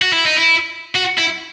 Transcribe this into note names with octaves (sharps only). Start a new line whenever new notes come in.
F#4
E4
D#4
E4
F#4
E4